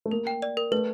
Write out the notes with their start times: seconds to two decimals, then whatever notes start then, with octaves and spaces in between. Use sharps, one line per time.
0.06 A3
0.11 A#3 A#4
0.27 G5
0.42 D5
0.57 A#4
0.72 A3 B4